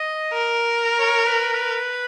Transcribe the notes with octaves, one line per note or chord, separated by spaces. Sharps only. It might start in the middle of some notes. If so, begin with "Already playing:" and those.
Already playing: D#5
A#4
C#5
B4
B4